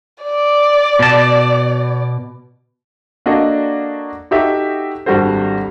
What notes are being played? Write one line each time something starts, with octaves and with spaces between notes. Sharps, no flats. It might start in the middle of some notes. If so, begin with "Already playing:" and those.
D5
B2 A5
A#3 D4 F#4 A4 D5 D#5
D#4 F#4 G4 A4 E5
G#1 G3 D4 F#4 A4 C5